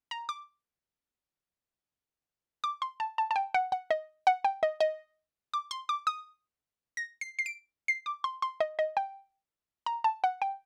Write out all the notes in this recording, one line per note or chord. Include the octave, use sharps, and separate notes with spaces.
A#5
D6
D6
C6
A5
A5
A5
G5
F#5
F#5
D#5
F#5
G5
D#5
D#5
D6
C6
D6
D#6
A#6
C7
C7
D7
C7
D6
C6
C6
D#5
D#5
G5
A#5
A5
F#5
G5